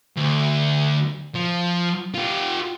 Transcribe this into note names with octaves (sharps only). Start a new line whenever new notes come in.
D2
F3
F4 G4